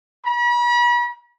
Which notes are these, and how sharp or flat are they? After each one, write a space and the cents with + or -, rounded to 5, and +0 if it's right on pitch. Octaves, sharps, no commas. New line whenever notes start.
B5 -40